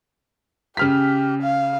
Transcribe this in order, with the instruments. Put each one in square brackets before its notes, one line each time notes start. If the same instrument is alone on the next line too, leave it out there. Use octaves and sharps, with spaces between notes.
[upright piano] C#3 F6 B6 [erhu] G4
[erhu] F5